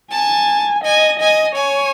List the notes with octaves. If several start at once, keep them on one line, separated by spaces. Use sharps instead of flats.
G#5 A5
D#5 G#5
D#5 G#5
C#5 G#5